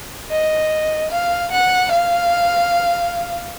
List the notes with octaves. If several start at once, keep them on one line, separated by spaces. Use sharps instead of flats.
D#5
F5
F#5
F5